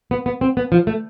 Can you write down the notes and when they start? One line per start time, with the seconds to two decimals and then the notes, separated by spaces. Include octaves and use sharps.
0.11 B3
0.26 B3
0.41 C4
0.57 B3
0.72 F3
0.87 A3